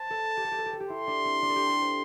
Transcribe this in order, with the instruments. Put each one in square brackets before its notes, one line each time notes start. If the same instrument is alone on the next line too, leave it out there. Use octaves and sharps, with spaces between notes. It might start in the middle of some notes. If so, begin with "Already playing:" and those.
Already playing: [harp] C5 [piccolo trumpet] A5
[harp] A4
G4
A4
G4
A4
G4
A4
G4
[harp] E4 [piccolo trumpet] C6
[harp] D4
C4
D4
A4
G4
A4
C5